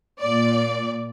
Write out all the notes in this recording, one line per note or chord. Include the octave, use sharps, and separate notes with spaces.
A#2 D5